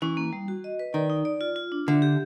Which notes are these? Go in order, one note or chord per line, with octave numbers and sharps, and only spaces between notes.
E3 C#4
A#3
G3
F#4
D#5
B4
D#3 D5
D#4
D5
F4
F4
D4
D3 E5
G4